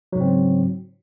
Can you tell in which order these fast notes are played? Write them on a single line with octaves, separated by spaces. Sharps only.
F#3 G#2 C#3 C4